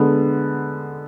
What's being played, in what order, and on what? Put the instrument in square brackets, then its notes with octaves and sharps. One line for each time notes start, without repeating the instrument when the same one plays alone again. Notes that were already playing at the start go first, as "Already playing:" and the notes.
Already playing: [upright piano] D3 G#3 B3